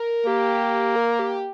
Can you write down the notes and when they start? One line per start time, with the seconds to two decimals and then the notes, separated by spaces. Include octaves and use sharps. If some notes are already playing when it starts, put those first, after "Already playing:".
Already playing: A#4
0.26 A#3 G4
0.96 A#4
1.19 G4